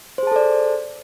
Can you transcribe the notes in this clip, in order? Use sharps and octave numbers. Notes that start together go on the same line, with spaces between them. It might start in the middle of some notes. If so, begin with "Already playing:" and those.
G#4 A4 C5 D5 A5